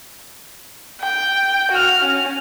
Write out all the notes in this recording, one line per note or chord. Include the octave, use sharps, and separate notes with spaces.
G5
F#4 F6
C#4